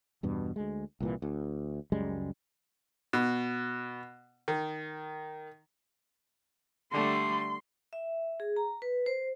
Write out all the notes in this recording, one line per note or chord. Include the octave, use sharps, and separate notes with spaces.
E2 G2 B2
D2 G#3
C2 A#2 E3
D2
C#2 F#2 G3 G#3
B2
D#3
D3 G3 A3 C6
E5
G#4
A#5
B4
C5